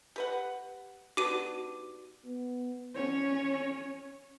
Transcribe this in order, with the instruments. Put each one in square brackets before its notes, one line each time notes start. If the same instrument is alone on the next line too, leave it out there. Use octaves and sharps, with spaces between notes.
[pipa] G4 B4 F#5
[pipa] B3 D4 G4 [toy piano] D#4 F#4 [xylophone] D6 D#7
[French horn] B3
[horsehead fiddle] C#4 C#5